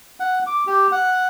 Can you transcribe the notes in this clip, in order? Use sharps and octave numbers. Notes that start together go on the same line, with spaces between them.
F#5
D6
G4
F#5